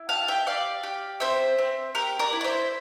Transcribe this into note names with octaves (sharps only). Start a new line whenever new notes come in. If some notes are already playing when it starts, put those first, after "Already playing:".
Already playing: E4
G4 F5 A5
E5 G5
G4 D5 F5
G4
C4 C5 E5
C4
G4 A#4
A#4 D5
E4
D5
C5 E5